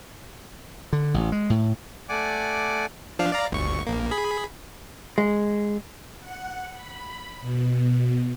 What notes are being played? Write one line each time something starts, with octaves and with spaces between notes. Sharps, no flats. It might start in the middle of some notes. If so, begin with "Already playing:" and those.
D3
A1
G#3
A2
A3 D5 F#5 G#5 D6
F3 D4 F5
D5 F5 A#5
G1 D2 C#6
A#1 A#3
G#4 B5
G#3
F#5
B5
B2